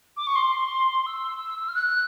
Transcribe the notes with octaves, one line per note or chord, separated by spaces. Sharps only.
D6
C#6
C6
E6
F6
F#6